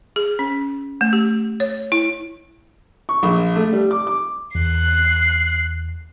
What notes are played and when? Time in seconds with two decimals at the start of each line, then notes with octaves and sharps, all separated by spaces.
0.16 G#4
0.39 C#4
1.01 A3
1.13 G4
1.60 C#5
1.92 E4
3.09 C#6
3.23 A#1
3.56 A3
3.72 G3
3.91 D6
4.07 D6
4.55 E2 F#6 C7